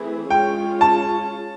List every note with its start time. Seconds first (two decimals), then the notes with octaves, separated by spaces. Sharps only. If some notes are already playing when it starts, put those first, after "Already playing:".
Already playing: E3 A3 C4 E4 G#4
0.30 G#3 C#4 F4 G#4 C#5 G5
0.81 A5